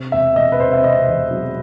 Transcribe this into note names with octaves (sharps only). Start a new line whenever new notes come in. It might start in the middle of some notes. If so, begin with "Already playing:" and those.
Already playing: C3
E1 E5
E1 D#5
B4
C3 C5
E5
C3 D#5
E2
F#3